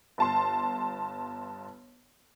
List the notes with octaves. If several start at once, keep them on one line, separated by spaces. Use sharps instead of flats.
G1 A5 C6